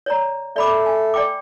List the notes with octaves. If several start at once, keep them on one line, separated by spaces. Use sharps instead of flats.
C#5 D5 A#5
A3 D5 B5 D6
G#5
D5 G5 D6